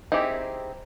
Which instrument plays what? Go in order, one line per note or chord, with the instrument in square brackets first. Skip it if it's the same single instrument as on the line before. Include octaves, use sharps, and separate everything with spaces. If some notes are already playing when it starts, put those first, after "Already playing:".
[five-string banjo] C4 D#4 E4 G4 G#4